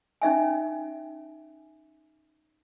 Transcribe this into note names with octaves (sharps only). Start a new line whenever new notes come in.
C#4 D#4 E5 G#5